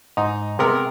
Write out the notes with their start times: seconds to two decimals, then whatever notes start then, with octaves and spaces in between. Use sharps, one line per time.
0.17 G#2 D#4
0.59 C3 G#3 B3 A#4